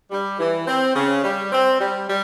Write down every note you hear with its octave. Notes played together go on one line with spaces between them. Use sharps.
G3
E3
C4
C#3
G3
C4
G3
G3